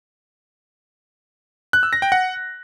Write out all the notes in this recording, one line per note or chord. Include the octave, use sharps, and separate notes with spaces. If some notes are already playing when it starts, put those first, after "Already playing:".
F#6
E6
A#6
G5
F#5